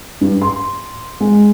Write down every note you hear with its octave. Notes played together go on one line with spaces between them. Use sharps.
G2
C6
G#3